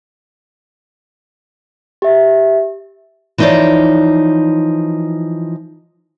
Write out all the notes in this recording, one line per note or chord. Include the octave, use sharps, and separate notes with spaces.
G4 E5
E3 F3 D#4 A4 C#5 D5